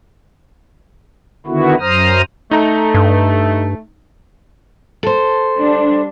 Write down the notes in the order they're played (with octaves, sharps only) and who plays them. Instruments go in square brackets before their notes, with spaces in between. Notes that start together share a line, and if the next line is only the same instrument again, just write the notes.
[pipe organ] D3 D#3 B3 E4 F#4
F#2 C5 A#5 D#6 F6
[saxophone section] A3 [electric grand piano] D#4 A#5
[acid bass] G2
[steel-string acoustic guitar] A4 C5
[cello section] G3 D4